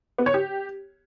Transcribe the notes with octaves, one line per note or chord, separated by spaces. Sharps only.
B3
C#5
G4